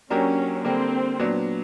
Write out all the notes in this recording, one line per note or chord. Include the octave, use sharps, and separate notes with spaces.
F#3 A#3 C#4 D4 G4 A#4
D3 G3 A#3 C4
A#2 F#3 B3 D4